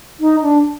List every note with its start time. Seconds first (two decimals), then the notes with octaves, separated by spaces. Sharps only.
0.20 D#4
0.42 D4